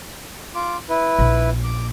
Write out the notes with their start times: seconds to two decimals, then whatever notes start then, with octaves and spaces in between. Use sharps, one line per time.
0.55 F4 D6
0.89 E4 B4
1.19 A#1
1.64 D6